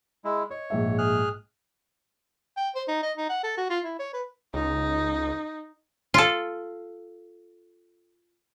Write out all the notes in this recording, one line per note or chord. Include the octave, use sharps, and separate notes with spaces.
G#3 E4
C#5 D#5
A#1 G#2 E5
G#4 F6 F#6
G5
C5
D#4
D#5
D#4
F#5
A4
F#4
F4
E4
C#5
B4
C#2 D#4
F4 A4